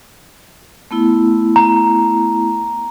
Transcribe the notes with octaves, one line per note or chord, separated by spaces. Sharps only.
A3 B3 E4
A#5